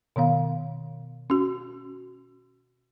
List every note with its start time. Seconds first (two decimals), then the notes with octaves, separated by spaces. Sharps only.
0.16 B2 D#3 B3 F5
1.30 C#4 F#4